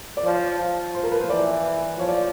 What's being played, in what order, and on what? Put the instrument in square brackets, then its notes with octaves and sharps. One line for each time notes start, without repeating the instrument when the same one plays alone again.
[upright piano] D5
[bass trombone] F3 [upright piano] C#5
[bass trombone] F3
[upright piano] C5
A#4
B4
C5
[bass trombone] E3 [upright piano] D5
[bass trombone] F3 [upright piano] C#5
[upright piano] D5